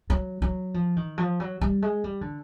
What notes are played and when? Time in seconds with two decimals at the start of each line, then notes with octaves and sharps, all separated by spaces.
0.10 F#3
0.42 F#3
0.74 F3
0.96 D#3
1.18 F3
1.40 F#3
1.61 G3
1.82 G#3
2.04 G3
2.21 D3